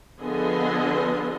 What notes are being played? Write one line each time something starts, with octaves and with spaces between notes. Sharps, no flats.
D3 F3 B3 G#4 D#5